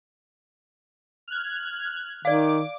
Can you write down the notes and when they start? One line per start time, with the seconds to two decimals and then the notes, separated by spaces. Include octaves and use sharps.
1.28 F6 F#6 G#6
2.25 D#3 D5 F5 D6